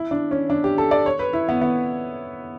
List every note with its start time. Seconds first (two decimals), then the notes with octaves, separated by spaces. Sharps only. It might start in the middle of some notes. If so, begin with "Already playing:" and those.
Already playing: E4
0.11 D4
0.31 C#4
0.50 D4
0.64 G4
0.78 A4
0.91 D5
1.06 C#5
1.19 B4
1.33 E4
1.49 B3
1.61 B3